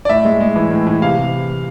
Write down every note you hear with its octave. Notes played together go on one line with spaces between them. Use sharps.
D5
A2 E5
G#3
G#3
E3
A2
E3
C3 F5
C3